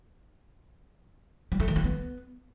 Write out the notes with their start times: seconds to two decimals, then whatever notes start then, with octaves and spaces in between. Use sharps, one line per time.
1.52 G3
1.60 A3
1.68 D#3
1.76 A3
1.84 B3